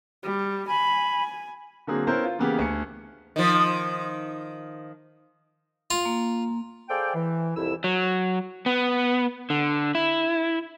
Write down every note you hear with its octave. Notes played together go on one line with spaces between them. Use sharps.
G3
G#5 B5
D3 F#3 A#3 C4 G#4
B3 C#4 E4 A#4 C5
F4
C#3 E3 A#3 B3 G4 G#4
D2 G#5 C#7
D#3 F3
F4
A#3
G#4 A4 C5 D5 F5 G5
E3
C2 F2 E4 E6
F#3
B3
D3
E4